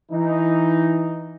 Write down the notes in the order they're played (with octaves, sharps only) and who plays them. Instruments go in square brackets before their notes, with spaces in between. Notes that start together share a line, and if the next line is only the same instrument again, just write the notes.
[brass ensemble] E3 D#4